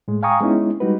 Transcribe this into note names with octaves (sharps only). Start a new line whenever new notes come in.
A2 G#3
F5 G5 G#5 A#5 C#6 D#6
G#3 B3 C#4 D#4 E4
G3 G#3 D#4 F#4 B4